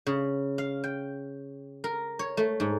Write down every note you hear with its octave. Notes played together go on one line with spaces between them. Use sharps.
C#3
F5
G5
A#4
C#5
A3
G#2